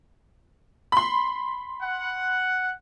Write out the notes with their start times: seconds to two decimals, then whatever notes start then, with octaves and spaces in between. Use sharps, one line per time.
0.92 B5 C6
1.82 F#5